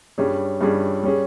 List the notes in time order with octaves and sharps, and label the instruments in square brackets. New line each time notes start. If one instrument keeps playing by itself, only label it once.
[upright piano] G2 G3 C#4 G#4
G2 G3 C#4 G#4
G3 C#4 G#4